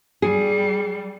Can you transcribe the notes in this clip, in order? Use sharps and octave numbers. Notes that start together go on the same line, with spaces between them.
G3 G#4